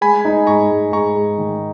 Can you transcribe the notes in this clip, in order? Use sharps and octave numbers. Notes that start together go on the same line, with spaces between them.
G#3 G#5 B5
D#4
G#2 A#5 C#6
G#2
G#2 A#5 C#6
G#2
D#3